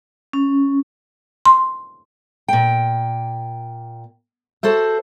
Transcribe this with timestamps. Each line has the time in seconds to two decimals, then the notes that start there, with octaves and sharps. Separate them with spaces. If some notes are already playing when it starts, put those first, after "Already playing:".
0.33 C#4
1.46 C6
2.48 A#2 G5
4.63 F#4 A4 C5 E5